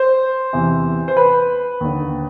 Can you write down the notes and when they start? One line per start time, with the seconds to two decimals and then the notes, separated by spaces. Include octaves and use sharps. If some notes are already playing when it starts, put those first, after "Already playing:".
Already playing: C5
0.53 E2 C3 E3
1.08 C5
1.17 B4
1.81 D#2 D3